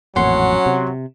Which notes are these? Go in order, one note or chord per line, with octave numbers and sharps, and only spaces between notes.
A1 F2 A#2 F#3 C#4 F#5 C6
C3